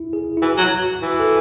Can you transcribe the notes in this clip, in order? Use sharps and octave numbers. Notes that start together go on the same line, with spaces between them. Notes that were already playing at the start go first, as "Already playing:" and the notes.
Already playing: E4
G#4
E4
E3 F#4
F#3
F#4
E3 F#4
A4